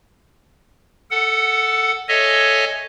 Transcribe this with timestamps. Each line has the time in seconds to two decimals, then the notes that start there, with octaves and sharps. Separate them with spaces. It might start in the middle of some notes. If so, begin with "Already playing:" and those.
1.11 A4 F#5
2.08 A4 C#5 D#5 E5 G#5